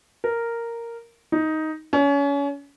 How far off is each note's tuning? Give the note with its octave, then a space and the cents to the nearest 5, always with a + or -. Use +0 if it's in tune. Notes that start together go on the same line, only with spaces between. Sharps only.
A#4 -5
D#4 +10
C#4 +30